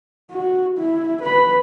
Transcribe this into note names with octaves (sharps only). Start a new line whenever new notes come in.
F#4
E4
B4 B5